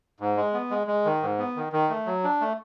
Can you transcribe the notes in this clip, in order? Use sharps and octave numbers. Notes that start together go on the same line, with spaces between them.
G#2
G#3
B3
G#3
G#3
D#3
G#2
B3
D#3
D#3
A3
F#3
D4
A3